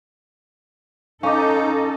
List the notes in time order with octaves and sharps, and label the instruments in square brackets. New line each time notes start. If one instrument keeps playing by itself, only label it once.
[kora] C#4 [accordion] D#4 [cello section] A4 [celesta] F5 D6